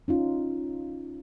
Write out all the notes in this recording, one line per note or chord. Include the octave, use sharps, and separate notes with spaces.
C#4 D#4 F4